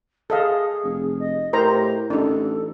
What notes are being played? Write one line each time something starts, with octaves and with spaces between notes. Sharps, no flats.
G#4 A4 D#5 F5
F1
D#5
A2 G4 A#4 C5 A#5
A1 D4 D#4 A4